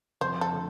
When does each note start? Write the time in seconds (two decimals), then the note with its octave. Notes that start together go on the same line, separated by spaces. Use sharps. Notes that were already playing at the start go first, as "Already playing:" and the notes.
0.21 F2 C5
0.41 A4
0.52 D3 A3